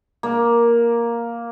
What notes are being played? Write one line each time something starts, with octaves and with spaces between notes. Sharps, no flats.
A#3